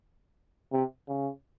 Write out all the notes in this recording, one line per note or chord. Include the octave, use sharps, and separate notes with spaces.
C3
C#3